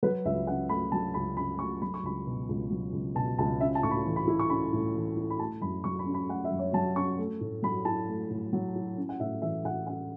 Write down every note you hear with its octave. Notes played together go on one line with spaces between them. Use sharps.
F#3 B4
C#2 E5
C#3 F#5
A3 B5
F#3 A5
C#2 B5
C#3 B5
A3 C#6
F#3 B5
C#6
C#2 B5
B2
C#2
F#3
C#2
B2 A5
C#2 A5
C#4 E5
A5
A2 C#6
B5
E3
B5
E4
C#6
C#4 B5
A2
E3
E4
B5
A3 A5
F#2 B5
F#3 C#6
B5
C#4
B5
A3 F#5
E5
F#2
C#5
F#3 A5
C#4 C#6
A3
A2
F#3 B5
E4 A5
A3
A2
F#3
E4
C#4
F#5
A2 E5
E3 E5
A2 F#5
C#4 F#5